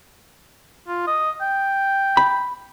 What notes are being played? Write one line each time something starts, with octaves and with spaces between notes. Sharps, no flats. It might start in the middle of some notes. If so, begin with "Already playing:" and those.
F4
D#5
G5
B5